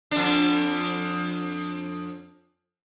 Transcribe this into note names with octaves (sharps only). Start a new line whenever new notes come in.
F2 D4